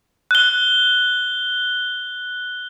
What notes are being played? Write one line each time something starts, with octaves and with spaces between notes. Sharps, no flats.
F#6 G7